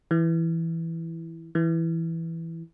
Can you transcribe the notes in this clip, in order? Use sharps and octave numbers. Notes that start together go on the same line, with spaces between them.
E3
E3